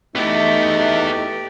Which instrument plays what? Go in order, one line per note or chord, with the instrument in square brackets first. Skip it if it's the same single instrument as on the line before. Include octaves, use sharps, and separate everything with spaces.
[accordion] A3 [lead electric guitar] B3 E4 [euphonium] D#4 [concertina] G4 D5